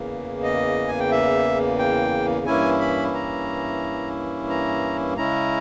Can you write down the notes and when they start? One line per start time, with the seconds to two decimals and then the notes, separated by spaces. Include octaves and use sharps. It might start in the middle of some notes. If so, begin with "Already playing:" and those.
Already playing: E2 C#3 E3 A#3
0.43 D#5
0.88 G#5
1.00 G5
1.11 E5
1.79 G5
2.46 G2 E3 A#3 C#4 E4 G#5
2.80 B5
3.14 A#5
4.49 A#5
5.17 C#3 G#3 C#4 E4 A#5